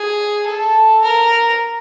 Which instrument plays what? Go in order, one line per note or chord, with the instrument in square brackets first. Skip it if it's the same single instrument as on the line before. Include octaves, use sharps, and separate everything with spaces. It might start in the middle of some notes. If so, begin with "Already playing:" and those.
Already playing: [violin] G#4
A4
A#4